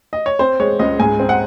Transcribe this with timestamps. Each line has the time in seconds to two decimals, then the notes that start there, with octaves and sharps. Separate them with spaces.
0.13 D#5
0.26 C#5
0.39 C4 C5
0.60 G#3 C#5
0.79 C#2 D#5
1.00 G#2 G#5
1.20 C4
1.29 F#5